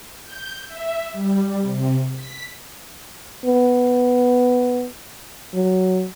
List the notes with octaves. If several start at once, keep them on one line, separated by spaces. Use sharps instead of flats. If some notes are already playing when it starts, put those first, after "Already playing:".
G6
E5
G3
C3
B6
B3
F#3